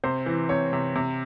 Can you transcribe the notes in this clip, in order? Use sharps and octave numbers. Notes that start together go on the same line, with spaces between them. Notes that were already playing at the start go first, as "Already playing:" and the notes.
C3 C5
E3
C3 C#5
C3
C3